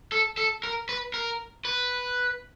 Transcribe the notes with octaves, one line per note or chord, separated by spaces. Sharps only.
A4
A4
A#4
B4
A#4
B4